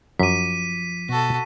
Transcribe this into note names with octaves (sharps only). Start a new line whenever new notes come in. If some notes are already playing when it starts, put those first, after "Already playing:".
F#2 F3 D6 B6 D#7
B2 F#4 A4